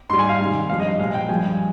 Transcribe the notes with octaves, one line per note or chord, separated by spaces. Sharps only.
G#2 G3 C6
G#5
F5
C3 D#3 G#3
G2 F3 G#3 F5
D#5
A#2 F3 G#3 F5
G5
G2 F3 G#3 G#5